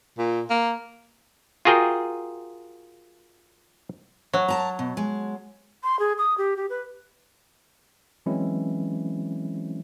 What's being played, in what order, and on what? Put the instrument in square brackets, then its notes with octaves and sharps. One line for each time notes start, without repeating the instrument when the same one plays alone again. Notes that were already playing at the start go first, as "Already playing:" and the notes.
[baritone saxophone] A#2
A#3
[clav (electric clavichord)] F4 F#4 G#4 A#4 G5
[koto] F#3
[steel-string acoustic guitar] A#4 A5 A#5
B2
G#3
[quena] C6
G#4
D#6
G4
G4
B4
[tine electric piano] E3 F#3 G#3 C4 C#4 E4